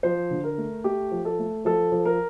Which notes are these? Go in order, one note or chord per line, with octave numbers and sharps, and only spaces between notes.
F3 C5
D3
A#4
A3
A3 G4
F3
A4
A3
F3 A4
F3
A#4